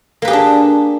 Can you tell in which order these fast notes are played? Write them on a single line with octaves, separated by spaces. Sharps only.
A#3 B4 G4 G#4 D4